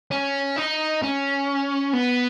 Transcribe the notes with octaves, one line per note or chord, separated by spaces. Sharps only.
C#4
D#4
C#4
B3